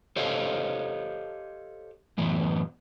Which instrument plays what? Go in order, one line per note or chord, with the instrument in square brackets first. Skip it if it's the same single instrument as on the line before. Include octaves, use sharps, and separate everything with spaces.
[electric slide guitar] G4 A4 C5 C#5 D#5 F5
F#2 A2 E3 B3